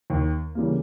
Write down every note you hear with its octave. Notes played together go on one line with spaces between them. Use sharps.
D#2
C#3 E3 G3 A#3